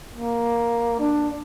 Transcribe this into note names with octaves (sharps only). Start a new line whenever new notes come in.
A#3
D4